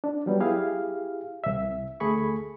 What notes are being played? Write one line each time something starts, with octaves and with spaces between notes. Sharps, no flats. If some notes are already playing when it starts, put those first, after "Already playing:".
D4
F#3 G3 B3
E4 G4 G#4 F5
C2 E5
D2 A3 G#4 B5 C#6